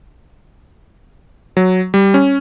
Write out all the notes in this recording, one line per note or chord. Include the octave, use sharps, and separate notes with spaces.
F#3
G3
C#4